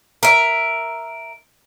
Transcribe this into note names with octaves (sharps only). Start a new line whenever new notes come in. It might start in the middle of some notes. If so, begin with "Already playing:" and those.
A#4 E5